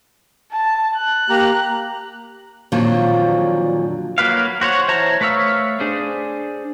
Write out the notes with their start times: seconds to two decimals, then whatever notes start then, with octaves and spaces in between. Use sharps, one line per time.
0.53 A5
0.96 F#6
1.30 A#3 G4 A#5
2.72 F2 A#2 D3 D#3 F3 F#3
4.18 F#3 A#3 B4 F5
4.61 F#4 C5 C#5 F#5
4.88 E3 C5 C#5 A5 A#5
5.21 A3 B4 C#5 F5 E6
5.80 D4 G#4 C5